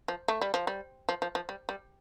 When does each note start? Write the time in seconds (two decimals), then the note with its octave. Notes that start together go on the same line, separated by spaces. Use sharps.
0.08 F3
0.28 A3
0.41 G3
0.54 F3
0.67 G3
1.09 F3
1.22 F3
1.35 F3
1.49 G3
1.69 G3